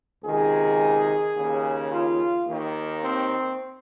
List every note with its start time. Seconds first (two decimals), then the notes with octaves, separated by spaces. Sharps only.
0.24 C#2 C3 D#3 G#4
1.35 D#2 C#3
1.91 F4
2.47 D#2 D#3
3.02 C4